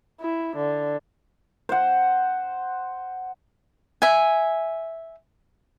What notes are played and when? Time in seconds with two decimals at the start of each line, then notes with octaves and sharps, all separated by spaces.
0.20 E4
0.56 D3
1.69 C5 F#5
4.02 E5 G#5